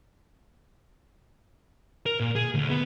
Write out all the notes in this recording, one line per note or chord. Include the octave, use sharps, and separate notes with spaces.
A#4
A#2
G#4
D2
B3